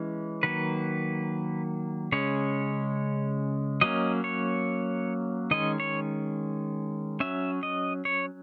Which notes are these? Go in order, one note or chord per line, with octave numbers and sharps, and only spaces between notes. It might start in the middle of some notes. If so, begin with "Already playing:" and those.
Already playing: E3 G#3 C#4
D#3 F#3 A#3 B4
C#3 G#3 C#4 C#5
F#3 A#3 C#4 D#5
C#5
D#3 G#3 C#4 D#5
C#5
F#3 C#4 E5
D#5
C#5